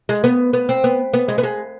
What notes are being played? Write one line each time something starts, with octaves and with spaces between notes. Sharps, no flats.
G#3
B3
B3
C4
B3
B3
G#3
B3
G#3